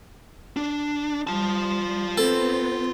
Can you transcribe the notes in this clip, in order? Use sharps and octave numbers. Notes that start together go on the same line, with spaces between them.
D4
G3 F4 A5
B3 C4 A4